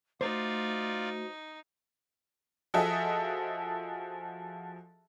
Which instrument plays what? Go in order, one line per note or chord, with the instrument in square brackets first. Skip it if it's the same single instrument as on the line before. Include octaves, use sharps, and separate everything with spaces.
[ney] A3 [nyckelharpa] D#4 [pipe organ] F4 D5 [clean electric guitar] F#4 C5
[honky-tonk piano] F3 F#4 G#4 A4 D#5 E5